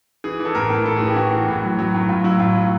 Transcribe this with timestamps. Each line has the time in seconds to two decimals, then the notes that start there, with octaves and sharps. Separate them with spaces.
0.24 E3 G#4
0.40 E3
0.45 A4
0.55 A2 A#4
0.70 A2
0.85 E3 A4
0.96 E3 G#4
1.07 G4
1.16 E3 F#4
1.32 E3
1.48 A2
1.63 F#3
1.79 F#3
1.94 A2
2.09 A2 F4
2.24 F#3 E4
2.39 A2 F4
2.55 F#3